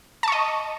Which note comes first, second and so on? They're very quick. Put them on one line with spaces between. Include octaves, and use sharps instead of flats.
A5 C#6 D#5